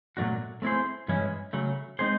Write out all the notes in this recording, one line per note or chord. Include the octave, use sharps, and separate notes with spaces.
A#2 F#3 A3 D4 F#4
A3 C4 E4 G#4 C5
G2 E3 G#3 C#4 E4
C#3 F#3 A3
G#3 C4 D#4 G#4 C5